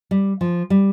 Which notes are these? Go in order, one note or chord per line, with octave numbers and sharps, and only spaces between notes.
G3
F3
G3